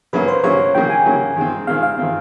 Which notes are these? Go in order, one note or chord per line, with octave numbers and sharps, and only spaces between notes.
C#3 F#3 A#3 B4
C5
C#3 F#3 A#3 C#5
C#3 F#3 A#3 G5
G#5
C#3 F#3 A#3
D#3 G#3 C4
D#3 G#3 C4 F5
F5
D#3 G#3 C4